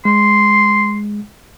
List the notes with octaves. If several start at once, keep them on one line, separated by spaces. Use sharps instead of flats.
G#3 C6